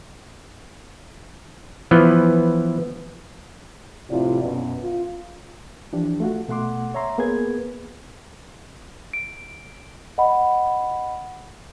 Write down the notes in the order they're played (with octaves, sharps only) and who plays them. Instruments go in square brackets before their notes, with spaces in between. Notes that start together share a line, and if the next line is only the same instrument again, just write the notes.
[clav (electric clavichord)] E3 F3 B3
[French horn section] A2 C3 F3 E4 F4 D5
F#2 B2
F4
[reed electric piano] E3 F3 D4 G4
A3 F4 F#4
B2 A3 F#5 C6 D6
C#5 E5 A#5 C6
A#3 B3 G#4 B4 G#6
[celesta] D7
D#5 F#5 B5